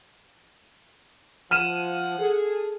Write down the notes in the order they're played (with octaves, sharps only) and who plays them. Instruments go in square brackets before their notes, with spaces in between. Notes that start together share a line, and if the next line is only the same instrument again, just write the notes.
[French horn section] F3 [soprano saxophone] F#5 [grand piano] F6 D#7 E7
[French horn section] G#4 A4